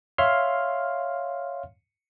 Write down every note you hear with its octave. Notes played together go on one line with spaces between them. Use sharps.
C#5 E5 F5 C6 F6